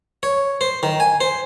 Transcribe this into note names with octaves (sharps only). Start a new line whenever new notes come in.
C#5
C5
D#3
G#5
C5